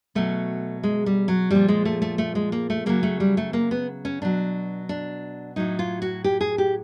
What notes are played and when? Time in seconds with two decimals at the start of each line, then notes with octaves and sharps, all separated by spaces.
0.15 B2 F#3 A3
0.83 G#3
1.06 G3
1.28 F#3
1.51 A#2 F3 G3
1.68 G#3
1.85 A3
2.02 A3
2.18 A3
2.35 G#3
2.52 A#3
2.70 A3
2.86 C#3 F#3 A#3
3.03 A3
3.20 G3
3.37 A3
3.53 A#3
3.71 B3
4.05 C#4
4.22 B2 F#3 D4
4.89 D4
5.56 A2 F#3 D#4
5.79 F4
6.02 F#4
6.24 G4
6.41 G#4
6.58 G4